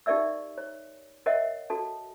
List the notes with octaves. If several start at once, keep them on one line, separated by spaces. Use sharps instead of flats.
D#4 G4 A#4 D5 E5 E6
C#5
A#4 C#5 D#5 E5 F#5
F#4 A4 A5